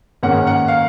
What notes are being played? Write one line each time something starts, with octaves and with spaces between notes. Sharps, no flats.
G#2 D#3 A#3 C#4 F#5
F#5
F5